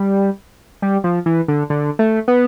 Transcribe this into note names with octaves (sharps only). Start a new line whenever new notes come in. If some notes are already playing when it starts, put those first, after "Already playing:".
Already playing: G3
G3
F3
E3
D3
D3
A3
B3